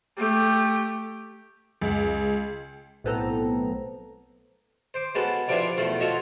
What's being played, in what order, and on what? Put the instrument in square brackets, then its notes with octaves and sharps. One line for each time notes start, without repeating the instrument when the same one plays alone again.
[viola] A3 G4
[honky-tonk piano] C#2
[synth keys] B1 A2 B3 C4 A4 A#5
[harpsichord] C5 D6
G#3 B3 C#4 F#4 A4
F2 C3 D4 E4 F4 B4
E2 B2 F3 A3
F4 F#4 A4 C#5 D#5 E5